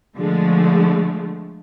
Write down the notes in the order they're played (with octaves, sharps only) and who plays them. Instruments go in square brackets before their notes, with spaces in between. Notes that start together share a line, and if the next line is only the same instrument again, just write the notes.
[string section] D3 F3 G#3 A3